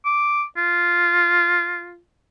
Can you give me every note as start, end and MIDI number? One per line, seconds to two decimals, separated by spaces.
0.05 0.44 86
0.57 1.99 65